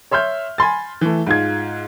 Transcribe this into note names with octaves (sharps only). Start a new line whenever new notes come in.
C#5 E5 C6 F6 G6
G#5 B5 C6 A6
E3 A3
G#2 F4 G#6